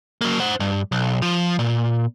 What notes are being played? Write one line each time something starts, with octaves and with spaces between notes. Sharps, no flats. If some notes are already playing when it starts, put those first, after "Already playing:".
F#3 A#3
C5 F#5
G2
B1
F3
A#2